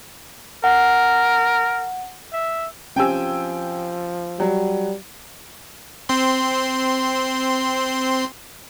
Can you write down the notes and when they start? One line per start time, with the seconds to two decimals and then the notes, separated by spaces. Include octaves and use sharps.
0.64 A#4 F#5
2.32 E5
2.96 F3 C4 C#4 G4 G5 G#5 E6
4.40 F#3 G3
6.09 C4 C6